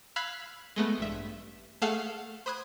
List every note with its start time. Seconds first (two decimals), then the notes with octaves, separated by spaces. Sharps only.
0.16 F5 B5 E6 F#6 G#6 B6
0.76 G#3 A3 B3
0.98 A1 G2 E5
1.82 A3 G#4 A4 F5 F#5 F6
2.46 C5 B5 D#6 F#6 G#6